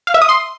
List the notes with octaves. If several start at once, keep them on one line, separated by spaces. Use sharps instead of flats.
F5
E5
D#6
C6